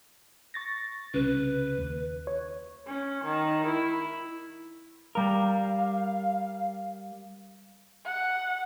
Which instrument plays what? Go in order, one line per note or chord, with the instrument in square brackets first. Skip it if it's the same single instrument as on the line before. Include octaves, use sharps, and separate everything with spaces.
[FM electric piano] C#6 A6 A#6
[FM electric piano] C2 C#3 [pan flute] B4
[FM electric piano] D#2
C#5
[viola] C#4
D#3
E4
[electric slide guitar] G3 A#4 [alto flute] F5
[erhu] F#5